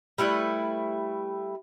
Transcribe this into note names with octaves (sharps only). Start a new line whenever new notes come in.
G3 A3 E4 B4